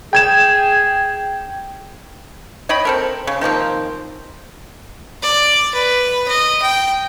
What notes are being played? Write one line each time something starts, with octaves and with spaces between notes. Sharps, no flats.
G#4 G5 G#6 E7
C#5 D#5 G5 B5
C4 A4 A#4
C#3
D#3 F3 A#3 C4
D5
B4
D#5
G5